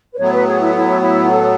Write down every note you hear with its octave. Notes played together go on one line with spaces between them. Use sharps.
B4
A2 F#3 B3 C#5
B4
G#4
E4
E4
E4
A4